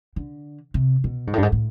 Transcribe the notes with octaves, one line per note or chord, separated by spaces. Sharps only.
D3
C3
B2
G#2
A2
G2
G#2
A2